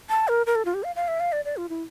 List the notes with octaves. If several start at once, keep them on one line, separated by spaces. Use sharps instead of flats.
A5
A#4
A#4
A4
F4
G4
F5
F5
E5
F5
D5
D5
F4
E4